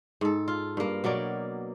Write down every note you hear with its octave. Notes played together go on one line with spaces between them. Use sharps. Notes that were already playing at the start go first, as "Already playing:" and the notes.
G#2 A4
F4
G2 A#3
B2 F#3 A#3 D5